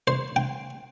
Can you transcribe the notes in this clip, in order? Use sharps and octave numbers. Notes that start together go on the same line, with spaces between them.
C5
G5